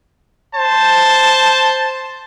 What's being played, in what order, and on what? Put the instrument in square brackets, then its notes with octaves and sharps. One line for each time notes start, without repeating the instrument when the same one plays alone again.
[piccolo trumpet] C5 [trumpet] A5